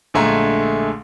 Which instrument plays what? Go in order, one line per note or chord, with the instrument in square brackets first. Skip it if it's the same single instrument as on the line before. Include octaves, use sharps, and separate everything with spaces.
[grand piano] A#1 D3 G#3 A3 G#5 A#5